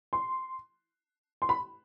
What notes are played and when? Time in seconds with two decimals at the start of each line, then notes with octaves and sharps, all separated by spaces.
0.13 C6
1.42 C6
1.49 B5